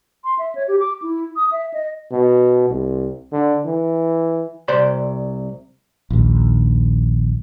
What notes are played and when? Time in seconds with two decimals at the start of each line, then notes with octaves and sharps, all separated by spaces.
0.24 C6
0.39 E5
0.55 C#5
0.68 G4
0.80 D6
1.02 E4
1.36 D#6
1.52 E5
1.74 D#5
2.12 B2
2.69 C2
3.32 D3
3.66 E3
4.68 C2 C5 D5 C6
6.10 A#1 D#2